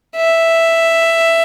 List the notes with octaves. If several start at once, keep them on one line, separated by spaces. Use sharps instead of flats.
E5